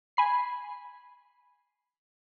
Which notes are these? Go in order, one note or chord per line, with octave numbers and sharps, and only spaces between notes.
G#5 B5 C7